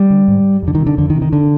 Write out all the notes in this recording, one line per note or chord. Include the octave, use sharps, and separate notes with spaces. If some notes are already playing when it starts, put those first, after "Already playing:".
Already playing: G3
D3
G#2
F2
D3
D#3
C3
D3
F2 D3
D#3
C3
D#3
D3